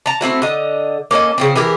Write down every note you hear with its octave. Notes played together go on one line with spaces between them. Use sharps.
A5 A#5
A3 C4 E4 F#4
D3 D#5
A#3 C#4 A4 D#5
C#3 F3 C4
E3 G4 G#4 A#4